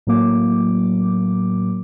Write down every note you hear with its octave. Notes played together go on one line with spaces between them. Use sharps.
A2 F#3 A#3 D6